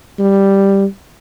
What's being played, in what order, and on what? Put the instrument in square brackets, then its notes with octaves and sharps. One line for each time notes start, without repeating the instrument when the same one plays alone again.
[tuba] G3